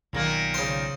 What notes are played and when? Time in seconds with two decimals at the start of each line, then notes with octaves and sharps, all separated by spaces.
0.13 B1 A#2 D#3 A#3
0.54 C#3 C5